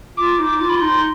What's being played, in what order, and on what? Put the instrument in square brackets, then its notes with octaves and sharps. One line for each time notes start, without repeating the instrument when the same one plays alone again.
[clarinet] F4 [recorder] D6
[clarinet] D#4
[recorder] D6
[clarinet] F4
[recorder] B5
C6
[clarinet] D#4